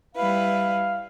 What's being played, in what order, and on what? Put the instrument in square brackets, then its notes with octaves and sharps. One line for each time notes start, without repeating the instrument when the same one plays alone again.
[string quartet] G3 E4 B4 [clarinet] F5